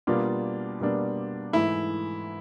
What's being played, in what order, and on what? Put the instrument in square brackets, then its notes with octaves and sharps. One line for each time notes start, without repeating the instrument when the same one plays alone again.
[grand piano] B2 G3 A#3 D4 [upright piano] F4
[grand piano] B2 G3 A#3 D4
[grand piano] G#2 E3 A3 [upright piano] E4